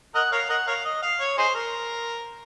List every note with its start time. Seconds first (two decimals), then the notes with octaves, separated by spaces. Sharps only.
0.15 A#4 D#5 F#5
0.32 A#4 C#5 F5
0.49 A#4 D#5 F#5
0.67 A#4 C#5 F5
0.85 D#5
1.02 F5
1.20 C#5
1.38 D#4 G#4 C5
1.55 A#4